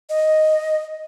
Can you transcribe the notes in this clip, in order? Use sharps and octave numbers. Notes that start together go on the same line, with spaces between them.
D#5